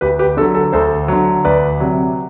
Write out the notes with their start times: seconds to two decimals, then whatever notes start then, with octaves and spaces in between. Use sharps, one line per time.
0.01 D2 G4 B4
0.19 G4 B4
0.37 D3 A4
0.41 F#3
0.55 A4
0.73 D2 A4 C5
1.08 D3 F#3
1.45 D2 B4 D5
1.80 C3 F#3